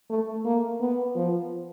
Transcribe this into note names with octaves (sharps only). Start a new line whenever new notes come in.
A3
A#3
B3
F3